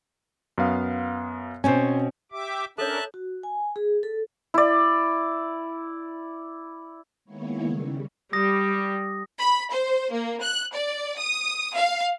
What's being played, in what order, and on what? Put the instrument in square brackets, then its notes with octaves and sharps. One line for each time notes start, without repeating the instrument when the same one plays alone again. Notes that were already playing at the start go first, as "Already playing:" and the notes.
[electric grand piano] F#2 B3 F5
[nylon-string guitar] B2 C4 C#4 [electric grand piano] C5 G#5
[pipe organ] G4 E5 D6
[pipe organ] C#4 D4 A#4 [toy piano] A4 C#5 [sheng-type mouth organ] E5 A5 F#6
[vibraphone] F#4
G#5
G#4
A4
[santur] E4 D5
[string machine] D#3 G#3 A#3 B3 E4 C#5
C#3 G3
[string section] G3 [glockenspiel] D#6 A#6
[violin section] B5
C5
A#3
F#6
D5
D#6
F5